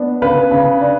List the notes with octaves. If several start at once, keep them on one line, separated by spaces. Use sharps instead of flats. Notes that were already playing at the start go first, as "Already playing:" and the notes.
Already playing: B3 D4
C#3 B4
C#3
D4